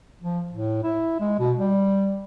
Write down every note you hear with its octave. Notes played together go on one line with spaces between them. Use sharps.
F3
A2
E4
G#3
B2
G3